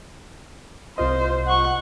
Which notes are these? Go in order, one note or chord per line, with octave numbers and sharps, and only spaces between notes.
C2 F4 C5 D#5
F#5 C#6